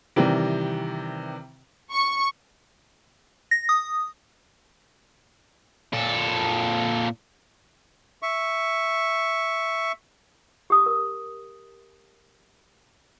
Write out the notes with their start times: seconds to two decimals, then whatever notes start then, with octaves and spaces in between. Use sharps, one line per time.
0.16 C3 D#3 E3 G3
1.92 C#6
3.51 A#6
3.69 D#6
5.93 A#2 A4
8.22 E5 C#6
10.70 G4 D#6
10.86 A#4